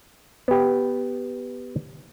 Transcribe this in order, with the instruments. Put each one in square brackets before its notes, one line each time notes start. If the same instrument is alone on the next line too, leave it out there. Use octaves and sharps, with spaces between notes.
[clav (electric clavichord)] B3 G4